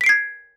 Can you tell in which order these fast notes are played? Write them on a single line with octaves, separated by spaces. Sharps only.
B6 D7 C7 G#6